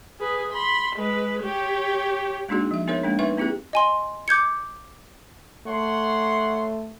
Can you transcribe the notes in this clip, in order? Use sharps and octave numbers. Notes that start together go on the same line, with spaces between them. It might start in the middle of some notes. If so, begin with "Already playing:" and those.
G#4 B4
B5 C6
G#3 B4
G4 C#5
G#3 A#3 D4 D#4 F#4 G#4
F3 E5
B3 D#4 G#4 A#4 C#5 E5
G#3 A#3 D4
B3 D#4 B4 E5 C#6
A#3 C4 E4 G4 G#4
D#5 G#5 C6
D6 G6 G#6 C#7
A3 C#5 F#5 C6